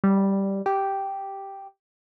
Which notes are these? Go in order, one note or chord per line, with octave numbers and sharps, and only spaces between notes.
G3
G4